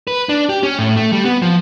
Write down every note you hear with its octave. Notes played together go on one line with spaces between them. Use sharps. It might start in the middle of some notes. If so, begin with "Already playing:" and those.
B4
D4
G4
C#4
A2
A3
G3
B3
F3